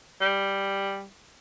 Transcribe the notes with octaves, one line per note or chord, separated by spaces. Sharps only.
G3